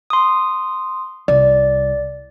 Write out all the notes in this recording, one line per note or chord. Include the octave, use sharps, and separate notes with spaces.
C6 D#6
C2 D5